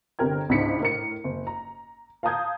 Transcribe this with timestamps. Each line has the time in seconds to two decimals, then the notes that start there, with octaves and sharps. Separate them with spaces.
0.19 G1 C3 A#4 G5 G#6
0.49 C#2 G#2 D4 E4 B6 C#7
0.80 A2 A#4 C#7
1.24 F#1
1.47 A#5
2.23 F5 A5 A#5 D#6 G6 G#6